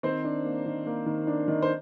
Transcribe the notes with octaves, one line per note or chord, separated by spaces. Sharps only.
D#3 C4 C5
D4
A#3
D#3
A#3
D#3
D4
D#3
C5